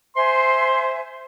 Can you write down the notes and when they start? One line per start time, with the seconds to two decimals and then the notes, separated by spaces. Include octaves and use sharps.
0.16 C5 E5 G#5 C6